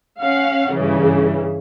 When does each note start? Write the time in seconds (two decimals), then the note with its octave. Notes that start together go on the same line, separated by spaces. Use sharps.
0.21 C#4 F5 F#5
0.73 G2 C#3 E3